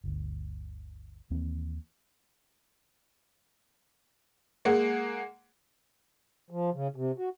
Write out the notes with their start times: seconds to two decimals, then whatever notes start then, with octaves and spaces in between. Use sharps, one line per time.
0.04 G1 D2
1.30 D#2 E3 A#3 C4
4.65 G#3 A#3 G#4 F#5
6.50 F3
6.74 C#3
6.96 C3
7.18 F#4